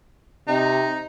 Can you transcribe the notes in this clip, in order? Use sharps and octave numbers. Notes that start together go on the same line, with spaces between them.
C3 D#4